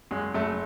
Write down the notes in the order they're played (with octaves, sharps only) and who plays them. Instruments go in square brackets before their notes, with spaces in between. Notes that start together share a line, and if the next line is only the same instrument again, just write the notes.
[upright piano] F#1 [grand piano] G#3
[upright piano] F#1 [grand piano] A3